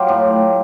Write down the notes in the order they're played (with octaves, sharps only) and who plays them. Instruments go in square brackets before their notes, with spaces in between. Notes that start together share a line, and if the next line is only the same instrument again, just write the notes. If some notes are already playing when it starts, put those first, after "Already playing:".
Already playing: [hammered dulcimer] F#3 F4 G4
A2